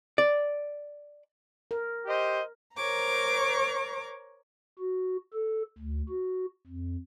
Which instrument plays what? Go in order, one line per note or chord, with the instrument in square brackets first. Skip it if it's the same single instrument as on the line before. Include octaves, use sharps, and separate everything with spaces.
[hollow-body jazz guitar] D5
[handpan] A#4
[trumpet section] G4 C5 D#5
[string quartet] A#4 C5 C#5 A#5 D6
[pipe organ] F#4
A4
D2
F#4
F2